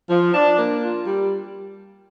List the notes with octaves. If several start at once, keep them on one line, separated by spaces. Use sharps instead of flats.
F3
D4
A#3
F4
G3